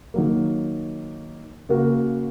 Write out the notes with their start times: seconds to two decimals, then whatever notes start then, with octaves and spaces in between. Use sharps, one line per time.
0.14 D#3 F#3 A#3
1.69 C#3 A#3 F#4 A#4